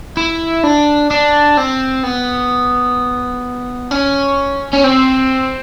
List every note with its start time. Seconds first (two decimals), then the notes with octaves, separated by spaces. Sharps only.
0.17 E4
0.64 D4
1.11 D4
1.57 C4
2.04 B3
3.91 C#4
4.73 C#4
4.84 C4